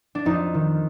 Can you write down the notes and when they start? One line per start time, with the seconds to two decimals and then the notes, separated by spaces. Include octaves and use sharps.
0.15 D4
0.25 F2 D#4
0.54 D#3